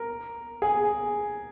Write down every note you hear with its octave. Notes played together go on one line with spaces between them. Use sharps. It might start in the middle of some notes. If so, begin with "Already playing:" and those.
Already playing: A#4
G#4